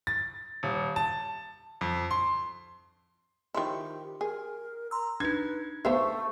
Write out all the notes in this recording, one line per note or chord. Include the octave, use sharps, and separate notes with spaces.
A6
D#1
A5
F2
C6
D#3 F3 E4 G4 C6
G#4 A#4
A#5 C6 E6
D4 D#4 B4 G#6
A3 B3 C5 E5 F5 C#6